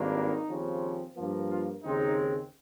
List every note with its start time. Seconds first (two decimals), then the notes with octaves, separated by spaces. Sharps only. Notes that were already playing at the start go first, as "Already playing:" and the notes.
Already playing: G#1 G2 D#3 A#3
0.15 D#4
0.48 D#2 C#3 F3 C4
1.16 G2 F3 A#3
1.50 F4
1.84 D#2 C#3 G#3 C4 D#4